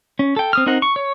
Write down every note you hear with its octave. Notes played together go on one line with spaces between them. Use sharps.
C#4
A4 G5
C4 D#6 F6
C4 D#4 A#4 F#5 A#5
C#6
C#5